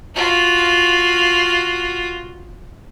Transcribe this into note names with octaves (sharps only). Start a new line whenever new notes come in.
F4 F#4